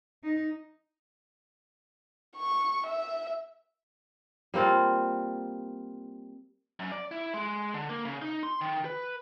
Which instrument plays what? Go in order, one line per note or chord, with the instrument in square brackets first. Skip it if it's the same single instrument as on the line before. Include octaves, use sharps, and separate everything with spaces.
[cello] D#4
[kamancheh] C#6
E5
[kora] G3 A#3 C4 F4
[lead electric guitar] F#2
D5
E4
G#3
D3
A#3
C#3
D#4
C6
D#3
B4